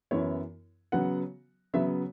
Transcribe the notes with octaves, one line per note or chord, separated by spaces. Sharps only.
F#2 E3 B3 E4 C#5
C#3 F#3 B3 F#5
C#3 F#3 B3 E5